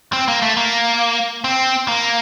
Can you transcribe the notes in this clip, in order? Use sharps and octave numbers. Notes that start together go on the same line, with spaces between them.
C4
A#3
A3
A#3
C4
A#3